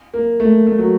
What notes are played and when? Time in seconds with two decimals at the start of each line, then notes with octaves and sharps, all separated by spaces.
0.14 A#3
0.40 A3
0.67 A3
0.79 F#3